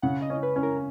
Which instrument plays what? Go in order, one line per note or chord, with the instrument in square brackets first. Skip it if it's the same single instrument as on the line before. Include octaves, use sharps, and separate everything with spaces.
[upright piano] C#3 [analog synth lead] F#5
[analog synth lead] D#5
[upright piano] C#4
[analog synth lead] B4
[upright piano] C#4
[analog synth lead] A#4